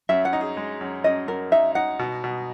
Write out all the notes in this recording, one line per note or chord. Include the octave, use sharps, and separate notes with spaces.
F#2 E5
F#5
D#4
G#4
G#3
F#2
F#2 D#5
F#2 A#4
D#4 E5
D#4 F#5
B2
B2